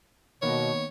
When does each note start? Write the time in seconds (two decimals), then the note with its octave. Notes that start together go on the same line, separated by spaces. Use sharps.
0.42 B2 D#3 A#3 B3 C#5